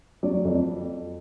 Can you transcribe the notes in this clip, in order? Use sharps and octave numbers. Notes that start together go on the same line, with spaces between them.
F#3 D5
F2